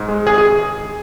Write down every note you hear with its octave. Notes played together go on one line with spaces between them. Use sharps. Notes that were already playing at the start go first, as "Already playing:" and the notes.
Already playing: G#2
G#3
G#1 G#4
G#4